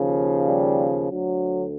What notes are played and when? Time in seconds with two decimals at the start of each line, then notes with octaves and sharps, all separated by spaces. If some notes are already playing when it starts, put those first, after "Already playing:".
Already playing: D#2 C#3 F3
0.47 G3
1.08 D2 D3 F#3